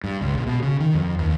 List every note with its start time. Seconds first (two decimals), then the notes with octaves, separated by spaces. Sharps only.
0.04 G2
0.21 C#2
0.34 A#1
0.47 B2
0.62 C#3
0.80 D#3
0.94 F2
1.19 D#2